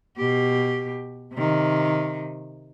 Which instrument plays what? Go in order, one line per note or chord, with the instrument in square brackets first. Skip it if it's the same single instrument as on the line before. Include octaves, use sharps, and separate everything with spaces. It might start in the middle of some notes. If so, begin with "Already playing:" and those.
[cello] B2 G4
C3 D#3